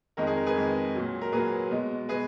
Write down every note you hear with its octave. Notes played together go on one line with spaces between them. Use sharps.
F2 D#3 G#3 A#4
G#4
A#4
G#4 B4
F2 D#3 G#3
A#2 F#3
A#4
A#2 F#3 G#4 B4
B2 G#3
B2 G#3 G#4 B4